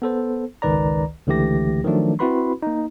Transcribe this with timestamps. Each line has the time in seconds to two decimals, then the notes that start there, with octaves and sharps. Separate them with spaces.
0.02 B3 A4 C5
0.62 G#1 C#2 D#3 B4 D5 A#5
1.27 C#2 D3 E3 A3 G4 A#6
1.85 D#3 F3 F#3 A3 D4
2.19 C4 E4 F#4 B4 B5 C6
2.62 A#3 D#4